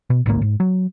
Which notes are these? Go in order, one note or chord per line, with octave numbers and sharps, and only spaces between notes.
B2
A1 D2 G#2 A#3
G#2
F#3